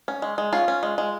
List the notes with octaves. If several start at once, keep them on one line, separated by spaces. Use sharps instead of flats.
C#4
G#3
G#3
C#4 F4
C#4
G#3
G#3